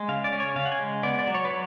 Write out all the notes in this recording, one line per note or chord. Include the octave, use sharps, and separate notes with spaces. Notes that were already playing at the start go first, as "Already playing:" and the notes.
Already playing: G#3
C#3 F5
D5
C#4
C#5
C#3 F5
F#5
G#5
G#3
B3 D5
D5
F#3
C#5
B4
F#3 C#5